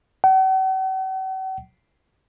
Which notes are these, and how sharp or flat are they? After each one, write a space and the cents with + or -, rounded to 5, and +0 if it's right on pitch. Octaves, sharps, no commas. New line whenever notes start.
F#5 +45